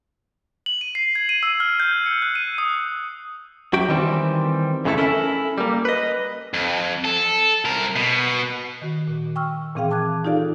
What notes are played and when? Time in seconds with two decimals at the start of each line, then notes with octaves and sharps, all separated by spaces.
0.66 F#7
0.81 D#7
0.95 C7
1.15 G#6
1.29 D#7
1.43 E6
1.60 F6
1.80 G6
2.06 C#7
2.22 F#6
2.35 D#7
2.58 D#6
3.73 F#2 F#4 G4 G5
3.89 D#3 E3 G3 C4
4.85 F2 C#3 E3 A3 E4 A4
4.97 C#4 E4 A4 A#4 C#5 E5
5.58 G3 A#3
5.85 B4 D#5
6.54 F2
7.05 A4
7.65 C2 A#4
7.96 B2
8.82 D#3 F#4
9.07 A#2
9.36 G5 C#6 E6 F6
9.75 A#2 E3 C4 G#4 F5 G5
9.91 A5 D6 F#6 G#6
10.25 D#4 F4 G4 A4 D5 F5